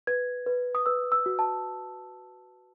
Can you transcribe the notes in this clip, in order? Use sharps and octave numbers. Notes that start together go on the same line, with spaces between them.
B4 G#6
B4
D#6
B4 E6
E6
F#4
A5